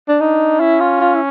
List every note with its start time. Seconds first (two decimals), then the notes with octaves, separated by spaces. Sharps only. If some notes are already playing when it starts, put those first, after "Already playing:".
0.08 D4
0.20 D4 D#4
0.60 C#4 E4
0.80 F4
1.01 F4
1.15 E4